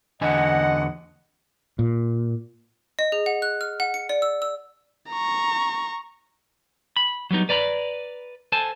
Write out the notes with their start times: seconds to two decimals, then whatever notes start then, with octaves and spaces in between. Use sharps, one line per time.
0.21 E2 D3 D#5 F#5 G#5
1.79 A#2
2.99 D#5
3.12 G#4
3.26 F#5
3.42 F#6
3.61 F6
3.80 F#5
3.94 C#7
4.09 D5
4.22 E6
4.42 E6
5.10 A#5 C#6
6.96 B5
7.31 F#3 G3 B3 D#4
7.49 B4 D5 A#5 B5
8.52 A4 C5 G#5 A5